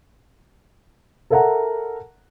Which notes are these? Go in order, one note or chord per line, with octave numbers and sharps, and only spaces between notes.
A4 A#4 E5 F#5 A5 A#5